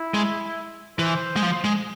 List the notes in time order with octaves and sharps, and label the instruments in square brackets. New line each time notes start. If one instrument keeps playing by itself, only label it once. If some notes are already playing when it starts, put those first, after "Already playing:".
Already playing: [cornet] E4
[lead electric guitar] G#3
[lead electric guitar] E3 [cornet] C5
[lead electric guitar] G#3
F3
G#3